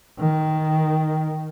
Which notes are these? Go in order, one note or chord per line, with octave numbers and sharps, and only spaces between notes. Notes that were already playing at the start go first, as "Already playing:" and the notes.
D#3